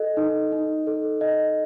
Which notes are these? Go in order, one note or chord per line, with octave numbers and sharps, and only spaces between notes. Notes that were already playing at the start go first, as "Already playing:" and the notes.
Already playing: A4 D#5
D#4
D#4
A4
D#5